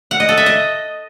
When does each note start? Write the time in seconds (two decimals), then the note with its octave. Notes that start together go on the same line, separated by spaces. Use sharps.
0.11 F#5
0.20 D#5
0.29 A4
0.37 E5
0.46 D#5